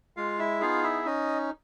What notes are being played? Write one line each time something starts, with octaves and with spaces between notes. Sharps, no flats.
G#3 F4 F5
E4 E5
B3 D#4 F4 G#4 F5
E4 E5
C#4 D#4 D#5